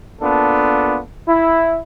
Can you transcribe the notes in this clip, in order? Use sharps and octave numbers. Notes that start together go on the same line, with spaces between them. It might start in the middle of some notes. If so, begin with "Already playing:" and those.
A#3 B3 D4 F4 A4
E4